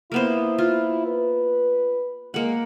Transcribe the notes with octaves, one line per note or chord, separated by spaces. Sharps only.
A#3 B3 E4 C5
F4
B4
G#3 A#3 F#5